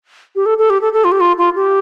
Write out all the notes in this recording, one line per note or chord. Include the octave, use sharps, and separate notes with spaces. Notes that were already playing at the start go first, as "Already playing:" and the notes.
G4
A4
A4
G4
A4
A4
F4
G4
F4
F4
G4